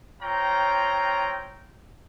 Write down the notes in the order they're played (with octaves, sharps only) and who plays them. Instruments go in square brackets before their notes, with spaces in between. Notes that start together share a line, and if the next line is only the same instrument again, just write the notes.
[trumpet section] C4 F4 C#5 G5 A#5